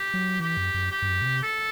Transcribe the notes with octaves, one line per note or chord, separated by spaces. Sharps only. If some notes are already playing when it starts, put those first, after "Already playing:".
Already playing: G4
F#3
E3 G4
F#2
F#2
G4
G2
F#2
B2
C3
A4